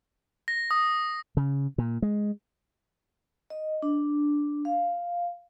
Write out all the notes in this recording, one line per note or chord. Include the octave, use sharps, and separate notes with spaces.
A#6
D#6
C#3
A#2
G#3
D#5
D4
F5